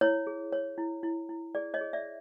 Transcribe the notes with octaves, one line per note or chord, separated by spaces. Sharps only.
E4 C#5
G#4
C#5
E4
E4
E4
G#4 D5
C#5 D#5
G#4
D5 E5